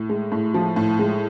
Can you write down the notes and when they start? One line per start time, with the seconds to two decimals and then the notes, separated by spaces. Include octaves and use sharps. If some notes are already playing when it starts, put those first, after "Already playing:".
Already playing: A2
0.09 G#3
0.32 A2
0.54 F3
0.76 A2
0.99 G#3